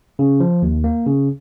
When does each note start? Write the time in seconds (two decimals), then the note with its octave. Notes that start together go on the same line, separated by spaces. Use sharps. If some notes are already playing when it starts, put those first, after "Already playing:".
0.19 C#3
0.40 F3
0.62 D#2
0.84 A#3
1.06 C#3